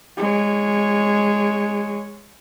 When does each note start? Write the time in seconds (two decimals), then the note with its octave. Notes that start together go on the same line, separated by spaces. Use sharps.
0.17 G#3 C#5